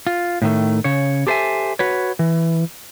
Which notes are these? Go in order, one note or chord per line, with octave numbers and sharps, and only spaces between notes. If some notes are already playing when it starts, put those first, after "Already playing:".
F4
A2 D#3 A3
C#3 C#5
G4 A4 C5 C#5 E5 G#5
F#4 B4 C#5
E3